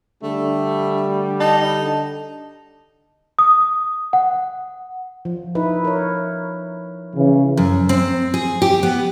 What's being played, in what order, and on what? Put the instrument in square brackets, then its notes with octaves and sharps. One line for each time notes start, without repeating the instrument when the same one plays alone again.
[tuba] D3 [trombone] G3 [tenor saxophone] A3
[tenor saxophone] D#4 [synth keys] A5
[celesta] D#6
F#5
[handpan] F3
D#4 E4 B4
A#4 C#5
[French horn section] C#3 E3
[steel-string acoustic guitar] F#2
C4
G#4
G4
B3